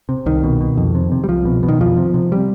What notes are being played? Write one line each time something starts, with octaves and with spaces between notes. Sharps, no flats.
C3
C2 D#3
B2
B2
F2
C3
C3
G3
C2 F3
B2
B2
D#3
F2 F3
C3
C3
G3